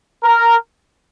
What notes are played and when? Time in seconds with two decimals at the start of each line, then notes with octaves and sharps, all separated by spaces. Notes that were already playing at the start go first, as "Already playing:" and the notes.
0.23 A#4